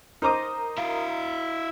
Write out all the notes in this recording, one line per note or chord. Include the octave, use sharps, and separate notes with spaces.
D#4 A#4 C5 A#5 D6 D#6
E4 F5